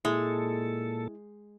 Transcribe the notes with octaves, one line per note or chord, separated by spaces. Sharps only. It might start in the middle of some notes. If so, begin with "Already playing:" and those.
A#2 G#3 E4 A4